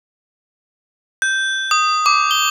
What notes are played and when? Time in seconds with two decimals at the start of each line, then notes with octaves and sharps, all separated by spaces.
1.22 G6
1.71 D#6
2.06 D6
2.31 G7